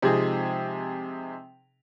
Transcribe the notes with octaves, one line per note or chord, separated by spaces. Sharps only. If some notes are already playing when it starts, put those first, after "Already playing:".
C3 F3 G#3 C4 D#4 G#4